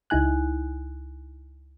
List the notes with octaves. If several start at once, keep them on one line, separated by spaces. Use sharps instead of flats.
C#2 D#4 E4 G#5 F#6